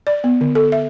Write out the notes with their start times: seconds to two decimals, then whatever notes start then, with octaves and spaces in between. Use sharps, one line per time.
0.07 D5
0.24 B3
0.41 D3
0.55 A4
0.72 E5